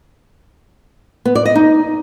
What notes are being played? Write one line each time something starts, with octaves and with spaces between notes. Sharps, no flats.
B3
D5
D#5
D#4